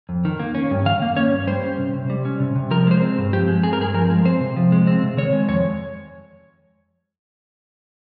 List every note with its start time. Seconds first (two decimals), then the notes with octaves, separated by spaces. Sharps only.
0.09 F2
0.25 D#3
0.40 A#3
0.55 C#4
0.71 G2
0.85 D#3 F5
1.02 A#3
1.16 C#4 C#5
1.33 G2
1.47 G3 C5
1.63 C#4
1.78 C3
1.94 C3
2.10 G3
2.25 C#4
2.40 C3
2.56 C3
2.71 F3 A#4
2.87 G#3 C5
3.01 C4
3.18 G2
3.33 F3 G4
3.48 G#3
3.63 C4 G#4
3.73 A#4
3.80 G2 G#4
3.94 F3 A#4
4.10 G#3
4.25 C4 C5
4.41 C3
4.56 F3
4.72 G#3
4.87 C4
5.03 C3
5.17 D#3 C#5
5.33 G#3
5.48 F2 C#5